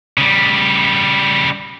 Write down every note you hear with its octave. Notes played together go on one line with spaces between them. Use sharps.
C#3 G3